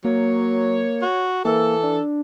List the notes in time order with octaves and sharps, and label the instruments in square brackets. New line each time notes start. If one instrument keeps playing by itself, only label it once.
[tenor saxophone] F#3 [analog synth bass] A#3 [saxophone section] C#5
[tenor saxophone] F#4
[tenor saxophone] E3 [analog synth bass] A#3 [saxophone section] A4
[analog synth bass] D4